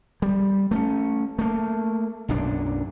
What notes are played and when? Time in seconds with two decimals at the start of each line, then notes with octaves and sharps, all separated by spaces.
0.22 G3
0.71 A3 C4 C#4
1.39 A3 A#3
2.28 B1 F#2 A#2 D4